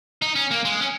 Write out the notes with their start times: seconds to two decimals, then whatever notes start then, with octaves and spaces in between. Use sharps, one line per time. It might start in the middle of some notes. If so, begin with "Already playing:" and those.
0.22 D#4
0.36 C#4
0.51 A#3
0.65 G#3
0.81 C#4